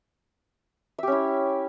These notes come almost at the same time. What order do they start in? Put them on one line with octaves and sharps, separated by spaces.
E5 G4 C#4 E4